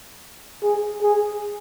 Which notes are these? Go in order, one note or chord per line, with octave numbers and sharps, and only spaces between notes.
G#4
G#4